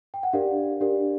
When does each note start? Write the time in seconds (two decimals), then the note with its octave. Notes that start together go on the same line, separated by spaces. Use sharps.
0.14 G5
0.23 F#5
0.33 D4 G4 A#4 D5 F5
0.80 D4 G4 A#4 D5